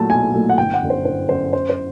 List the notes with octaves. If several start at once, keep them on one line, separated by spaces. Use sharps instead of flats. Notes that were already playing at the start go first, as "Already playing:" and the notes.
Already playing: A#2 F#3 A3 A5
B1 G#5
A#2 F#3 A3
F#5
G1 G5
F#5
F#2 D3
C5
G1 C5
F#2 D3 C5
F#2 C5
C5